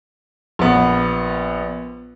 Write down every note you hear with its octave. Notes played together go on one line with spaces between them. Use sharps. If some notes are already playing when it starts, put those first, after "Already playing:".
A#1 B3